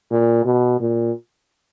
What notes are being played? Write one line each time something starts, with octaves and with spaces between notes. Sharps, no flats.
A#2
B2
A#2